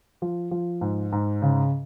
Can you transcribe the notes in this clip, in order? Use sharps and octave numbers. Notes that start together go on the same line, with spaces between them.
F3
F3
G#2
G#2
C#3